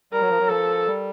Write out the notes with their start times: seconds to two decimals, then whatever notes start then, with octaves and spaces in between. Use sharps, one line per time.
0.12 G3 A#4
0.21 F#3
0.30 F3
0.40 F#3
0.48 F3 A4
0.86 G3